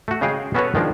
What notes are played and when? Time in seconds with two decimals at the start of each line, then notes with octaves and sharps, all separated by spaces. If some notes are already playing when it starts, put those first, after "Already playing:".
0.08 A3 F#4
0.21 C#3 G#3 G#4 F5 G5
0.55 B3 C#4 F#4 A4 B4 C#5
0.75 D#3 F3 G#3 D4